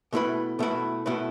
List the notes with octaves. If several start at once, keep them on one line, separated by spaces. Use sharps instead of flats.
B2 A3 E4 B4
B2 A3 E4 B4
B2 A3 E4 B4